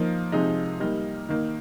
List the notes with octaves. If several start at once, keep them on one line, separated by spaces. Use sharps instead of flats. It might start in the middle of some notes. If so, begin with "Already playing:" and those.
Already playing: F3 A#3 D#4
C3 F3 G#3 D#4
G3 A#3 D#4
D#3 A#3 D#4